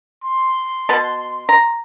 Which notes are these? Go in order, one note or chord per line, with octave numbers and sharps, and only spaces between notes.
C6
B2 B4 A5
A#5